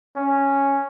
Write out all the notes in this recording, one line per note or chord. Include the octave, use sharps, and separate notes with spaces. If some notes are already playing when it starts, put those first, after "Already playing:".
C#4